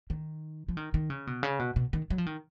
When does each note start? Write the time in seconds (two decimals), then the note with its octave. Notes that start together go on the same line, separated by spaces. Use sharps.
0.10 D#3
0.68 F3
0.77 D#3
0.94 D#3
1.10 C#3
1.27 B2
1.43 C#3
1.59 B2
1.76 B2
1.93 D#3
2.10 F#3
2.18 F3
2.26 D#3